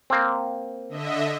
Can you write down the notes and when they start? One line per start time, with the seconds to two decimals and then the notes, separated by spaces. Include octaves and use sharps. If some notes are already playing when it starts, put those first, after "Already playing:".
0.10 A#3 C4
0.89 D3 D#5 E5